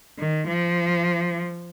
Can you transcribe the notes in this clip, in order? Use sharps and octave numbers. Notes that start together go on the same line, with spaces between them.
D#3
F3